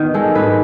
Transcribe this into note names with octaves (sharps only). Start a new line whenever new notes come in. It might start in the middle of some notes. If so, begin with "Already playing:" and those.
Already playing: D#3 B3
G#3 A4
G#2 B4